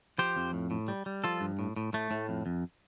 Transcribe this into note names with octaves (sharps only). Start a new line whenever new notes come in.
F3 G4 C5
F2
A2
A2
G3
G3
F3 F4 A4
G2
A2
A2
A2 A3
A2
F2
F2